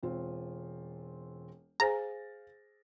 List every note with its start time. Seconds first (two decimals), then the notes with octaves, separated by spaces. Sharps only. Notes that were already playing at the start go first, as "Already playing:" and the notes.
0.03 E1 C4 F4
1.80 G#4 C5 F5 G#5 A#5 A6 A#6